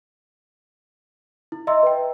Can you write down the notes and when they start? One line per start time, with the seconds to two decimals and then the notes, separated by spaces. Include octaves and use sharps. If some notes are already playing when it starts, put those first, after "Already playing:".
1.52 E4
1.67 D#5 E5 A#5 C6 E6
1.83 B4 G5